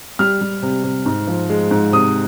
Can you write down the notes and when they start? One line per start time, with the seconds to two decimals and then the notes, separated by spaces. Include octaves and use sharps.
0.19 G3 F6
0.41 G3
0.63 C3
0.84 C3
1.06 G#2
1.27 F3
1.50 G#3
1.71 G#2
1.92 C3 D#6